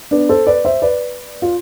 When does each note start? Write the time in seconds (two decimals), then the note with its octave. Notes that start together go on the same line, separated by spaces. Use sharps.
0.11 B3 D4
0.29 A4 C5
0.47 B4 D5
0.65 C5 E5
0.82 B4 D5
1.42 F4